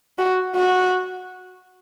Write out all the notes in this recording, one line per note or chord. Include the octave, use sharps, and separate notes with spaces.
F#4
F#4